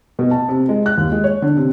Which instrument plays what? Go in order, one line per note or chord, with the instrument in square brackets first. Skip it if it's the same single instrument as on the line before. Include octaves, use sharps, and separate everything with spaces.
[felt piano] B2
A5
C3
G#3
F#6
D#2
G#3
C#5
D3
C3